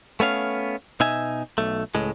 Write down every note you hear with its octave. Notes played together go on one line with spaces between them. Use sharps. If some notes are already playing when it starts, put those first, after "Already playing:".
A3 B3 C#4 F5
B2 D#4 E5 G#5
B1 A3
C#2 A2 G#3